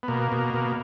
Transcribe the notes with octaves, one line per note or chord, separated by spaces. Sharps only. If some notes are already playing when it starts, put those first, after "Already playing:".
B3
B2 A#3
B2
B2